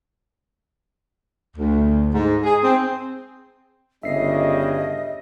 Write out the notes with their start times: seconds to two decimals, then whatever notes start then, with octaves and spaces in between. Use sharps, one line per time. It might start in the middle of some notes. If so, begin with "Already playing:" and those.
1.56 D2
2.11 G#2
2.43 G#4
2.62 C4
4.03 G1 C#3 G3 D4 D#5 E5 C7